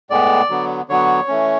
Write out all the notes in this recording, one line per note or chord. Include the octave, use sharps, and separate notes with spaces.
A2 G#3 B3 D5
D3 F#3 B3
D3 F#3 B3 C#5
E3 A3 C#4